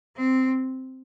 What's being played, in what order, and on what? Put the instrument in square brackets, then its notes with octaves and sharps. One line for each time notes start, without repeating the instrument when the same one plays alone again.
[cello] C4